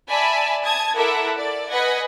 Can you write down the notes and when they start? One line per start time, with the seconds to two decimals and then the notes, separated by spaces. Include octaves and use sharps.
0.10 D5 E5 G#5 A5 B5
0.63 A5 D#6 G#6
0.95 E4 A4 A#4 E5 F#5 D6
1.38 D5
1.71 B4 D#5 F#5 G#5 B5 G#6